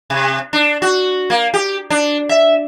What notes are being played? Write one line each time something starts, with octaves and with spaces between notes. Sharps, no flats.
C3
D4
F#4
A#3
G4
D4
E5